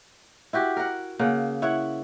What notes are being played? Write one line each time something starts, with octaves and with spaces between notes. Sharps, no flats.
E4 F#4 G4
A#4 F#5
C#3 A#3 F#5
E4 C#5 F#5